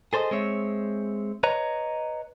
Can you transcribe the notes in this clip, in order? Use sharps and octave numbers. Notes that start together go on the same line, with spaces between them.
G#4 A4 C5 C#5 D#5
G#3 C4 C#5 E5
B4 C#5 D#5 A#5